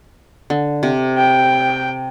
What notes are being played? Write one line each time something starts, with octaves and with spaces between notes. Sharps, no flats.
D3
C3
G5